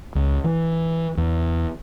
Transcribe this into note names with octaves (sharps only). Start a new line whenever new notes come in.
C#2
E3
E2